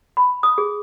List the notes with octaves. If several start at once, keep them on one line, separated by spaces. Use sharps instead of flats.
B5
D#6
G#4